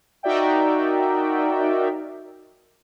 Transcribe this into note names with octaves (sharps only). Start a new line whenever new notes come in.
D#4 F#4 A#4 D5 E5 G5